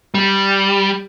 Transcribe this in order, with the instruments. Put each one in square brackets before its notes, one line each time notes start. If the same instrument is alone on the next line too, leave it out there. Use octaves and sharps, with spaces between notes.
[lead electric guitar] G3